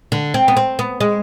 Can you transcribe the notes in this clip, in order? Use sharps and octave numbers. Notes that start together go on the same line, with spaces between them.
D3
C4
B3
C4
B3
G#3